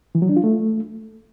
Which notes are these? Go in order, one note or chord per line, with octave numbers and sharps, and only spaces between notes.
E3
F#3
D4
F4
A3